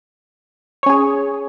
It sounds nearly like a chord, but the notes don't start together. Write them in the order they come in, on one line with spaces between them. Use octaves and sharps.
C#5 C#4 G#4